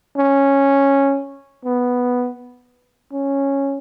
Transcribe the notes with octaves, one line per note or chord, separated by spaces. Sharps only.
C#4
B3
C#4